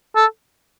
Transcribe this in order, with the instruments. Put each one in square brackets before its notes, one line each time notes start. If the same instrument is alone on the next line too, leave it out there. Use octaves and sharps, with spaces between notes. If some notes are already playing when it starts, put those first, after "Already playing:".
[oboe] A4